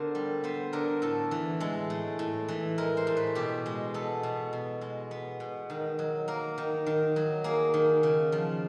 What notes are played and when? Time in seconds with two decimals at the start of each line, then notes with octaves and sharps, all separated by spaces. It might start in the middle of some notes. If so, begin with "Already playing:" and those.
Already playing: D3 B3 A#4 C5
0.15 G3
0.44 B3 C5
0.73 D3 A#4
1.02 A2 A4
1.31 E3
1.60 G#3 A4
1.90 A2
2.19 A2
2.48 E3
2.78 G#3 A#4
2.97 C5
3.07 A2
3.17 B4
3.35 B2 G4
3.66 G#3
3.94 B3 A4
4.23 B2
4.53 B2
4.81 G#3
5.11 B3
5.40 B2
5.70 D#3
5.99 F#3
6.28 A#3 A#4
6.58 D#3
6.86 D#3
7.16 F#3
7.44 A#3 G#4
7.74 D#3
8.03 C#3
8.32 F3